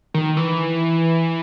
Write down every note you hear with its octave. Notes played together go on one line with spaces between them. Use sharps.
D#3
E3